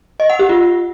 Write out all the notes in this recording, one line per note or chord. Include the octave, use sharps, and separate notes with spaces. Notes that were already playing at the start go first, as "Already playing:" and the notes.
D#5
F#5
G4
F4